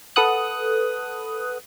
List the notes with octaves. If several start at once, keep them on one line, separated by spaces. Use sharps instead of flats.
A4 B4 F#5 D#6 F#6